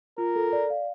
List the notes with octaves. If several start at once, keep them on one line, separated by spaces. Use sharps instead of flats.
F4 A#4
A4
D5
F5